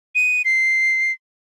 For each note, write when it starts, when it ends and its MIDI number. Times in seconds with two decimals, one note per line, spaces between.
0.15 0.42 99
0.45 1.12 96